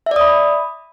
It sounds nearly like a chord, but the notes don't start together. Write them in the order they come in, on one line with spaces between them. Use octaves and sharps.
E5 D5 D#6 B5